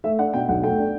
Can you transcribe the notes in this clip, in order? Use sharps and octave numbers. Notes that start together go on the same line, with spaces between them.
A3 E5
D4 F#5
B2 G5
B1 F#5
A3 G5
D4